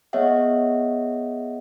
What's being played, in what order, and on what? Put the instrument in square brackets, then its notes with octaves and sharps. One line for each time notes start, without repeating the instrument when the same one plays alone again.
[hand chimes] B3 G#4 C#5 D#5 E5 F#5